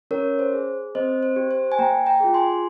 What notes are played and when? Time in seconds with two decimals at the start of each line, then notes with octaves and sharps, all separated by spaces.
0.11 C#4 A#4 C#5
0.39 C5
0.53 G#4
0.95 C4 C5 D#5
1.23 C5
1.36 G4
1.51 C5
1.72 G#5
1.78 A#3 G5 A#5
2.06 G5 A#5
2.20 F4 G#4
2.34 G#5 C6